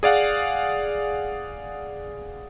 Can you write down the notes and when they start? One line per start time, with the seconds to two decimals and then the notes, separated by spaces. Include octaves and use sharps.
0.03 G#4 D5 F5 F#5